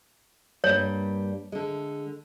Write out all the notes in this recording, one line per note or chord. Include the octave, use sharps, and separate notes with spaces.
G2 G3 A#3 C#5
D3 G#3